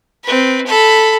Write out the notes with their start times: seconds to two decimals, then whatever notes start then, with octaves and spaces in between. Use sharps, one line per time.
0.24 C4 B4
0.66 A4 B5